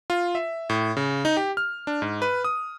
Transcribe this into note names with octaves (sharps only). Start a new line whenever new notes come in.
F4
E5
A2
C#3
D#4
G4
F6
D4
G#2
B4
D#6